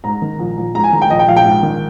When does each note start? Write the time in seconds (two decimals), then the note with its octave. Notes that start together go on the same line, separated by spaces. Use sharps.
0.04 G#2 A#5
0.22 D#3
0.39 A#1
0.57 A#1
0.75 G#2 A#5
0.84 G#5
0.92 D#3 A#5
1.02 G5
1.10 A#1 D#5
1.19 G5
1.28 A#1 F5
1.37 G5
1.45 G#2
1.63 D#3